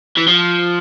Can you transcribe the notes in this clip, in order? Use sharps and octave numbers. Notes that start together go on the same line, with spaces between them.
E3
F3